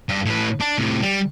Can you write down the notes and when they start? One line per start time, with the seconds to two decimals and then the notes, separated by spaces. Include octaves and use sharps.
0.09 G2
0.26 A2 B4
0.60 D4
0.78 A2 C3
1.02 G3